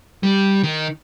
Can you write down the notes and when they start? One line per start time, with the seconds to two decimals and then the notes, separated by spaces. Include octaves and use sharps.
0.23 G3
0.63 D#3